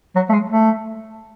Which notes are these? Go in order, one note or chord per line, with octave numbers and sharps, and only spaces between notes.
F#3
A3
G#3
A3